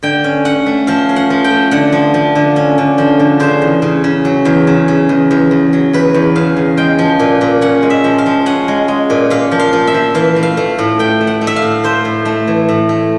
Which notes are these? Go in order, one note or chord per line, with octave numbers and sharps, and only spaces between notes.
D3 G5
C#4
C#4 F#5
A3
F3 F5
C#4
F#5
F3
G5
A3
D3 F#5
F3
F3
D3
C#4
D3
F3
D3
C#3 C5
E2
C#3
C#3
F#3
E2
C#3
C#3
E2
E2
E2
F#3
E2 B4
E2
C#3 F5
E2
G#3 G5
F3
A#2
A#2
C#4 F#5
G#3
E5
F3
F5
F3
C#4 F#5
G#3
G#3
A#2
A#2 F5
F3
F5
F3
E5
F3
E3 F5
A3
F5
A3
A2
A2 G5
A3
F#5
A3
E5
F5
A2
A3 C5
A2
A3
E3
A2
A3